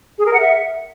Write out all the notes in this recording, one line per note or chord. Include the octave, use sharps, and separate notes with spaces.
G#4
A#4
F#5
E5